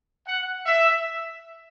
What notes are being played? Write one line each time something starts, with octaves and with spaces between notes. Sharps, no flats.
F#5
E5